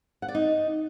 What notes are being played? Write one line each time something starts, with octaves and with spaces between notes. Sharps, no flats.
F#5
D5
D#4